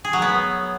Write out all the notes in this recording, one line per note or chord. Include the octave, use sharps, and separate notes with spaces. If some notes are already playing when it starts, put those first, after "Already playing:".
G#4
F#3
B3